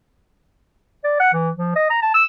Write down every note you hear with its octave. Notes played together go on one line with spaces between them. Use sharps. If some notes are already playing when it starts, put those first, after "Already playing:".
D5
F#5
E3
F3
D#5
A#5
A5
E6